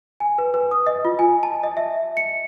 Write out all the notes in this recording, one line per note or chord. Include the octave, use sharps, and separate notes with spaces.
G#5
B4
B4
D#6
D#5
F4
G#5
A5
D#5
E5
C#7